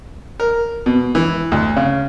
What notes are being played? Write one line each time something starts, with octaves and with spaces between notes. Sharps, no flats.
A#4
B2
E3
D2
C#3